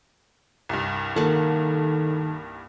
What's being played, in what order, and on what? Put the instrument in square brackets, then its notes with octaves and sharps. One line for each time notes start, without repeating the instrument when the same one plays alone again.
[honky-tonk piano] C2 G2
[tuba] D#3 [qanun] A#3 F#5 [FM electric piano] A4 A5